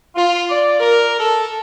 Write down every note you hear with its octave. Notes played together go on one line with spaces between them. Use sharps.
F4
D5
A#4
A4